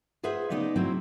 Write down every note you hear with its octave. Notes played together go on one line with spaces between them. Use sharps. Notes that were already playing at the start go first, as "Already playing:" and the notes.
F4 G#4 B4 C5 E5 F#5
C#3 B3 D#4 D5 D#5
F#3 C4 E4 C5